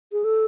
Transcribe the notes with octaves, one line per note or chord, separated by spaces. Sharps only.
G#4
A4